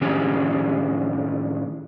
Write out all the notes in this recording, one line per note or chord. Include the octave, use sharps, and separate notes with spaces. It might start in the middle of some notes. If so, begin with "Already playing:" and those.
A2 D#3 C#4 D4 G4 G#4